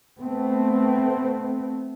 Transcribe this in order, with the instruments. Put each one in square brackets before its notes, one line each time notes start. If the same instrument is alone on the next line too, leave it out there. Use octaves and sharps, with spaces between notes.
[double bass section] A3 B3 C4